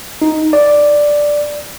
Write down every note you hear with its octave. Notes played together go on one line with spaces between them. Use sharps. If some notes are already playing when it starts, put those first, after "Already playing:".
D#4
D5